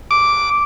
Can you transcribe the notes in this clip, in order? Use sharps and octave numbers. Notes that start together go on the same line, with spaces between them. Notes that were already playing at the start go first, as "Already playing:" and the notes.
D6